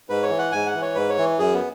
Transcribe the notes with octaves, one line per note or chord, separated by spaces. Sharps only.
G#2 B4
C#5
E3
F#5
G#2 G#5
F#5
E3
C#5
G#2 B4
C#5
E3
F#2 G#4
B3